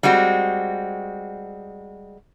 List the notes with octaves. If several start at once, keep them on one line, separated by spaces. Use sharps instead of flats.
G3 G#3 C4 F#4